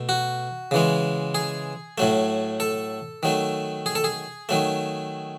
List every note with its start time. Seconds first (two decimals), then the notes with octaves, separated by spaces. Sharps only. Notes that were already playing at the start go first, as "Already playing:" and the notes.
Already playing: B2 A3
0.09 F#4
0.71 C#3 E3 G#3
1.35 G#4
1.98 A2 F#3 A3
2.60 A4
3.23 D#3 F#3 A3
3.86 G#4
3.95 A4
4.04 G#4
4.49 D#3 F#3 A3